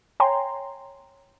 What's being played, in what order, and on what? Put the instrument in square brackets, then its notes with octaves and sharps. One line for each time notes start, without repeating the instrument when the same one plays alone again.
[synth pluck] C#5 G5 G#5 A#5 C6